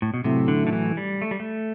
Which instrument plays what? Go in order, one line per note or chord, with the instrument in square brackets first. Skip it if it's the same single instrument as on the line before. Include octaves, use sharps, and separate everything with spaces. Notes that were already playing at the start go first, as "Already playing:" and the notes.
[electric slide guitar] A2
B2
[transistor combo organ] A2 F#3 A3 E4 [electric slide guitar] C3
[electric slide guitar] D3
D3
E3
G3
A3
G3
A3